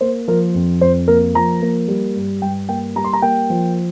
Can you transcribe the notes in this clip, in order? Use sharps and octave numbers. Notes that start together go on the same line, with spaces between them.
A#3 C5
F3 A#4
F2
F2 C5
A#3 A#4
F3 A#5
A#3
G3
G2
G2 G5
A#3 G5
G3 A#5
C6
A#5
A#3 G5
F3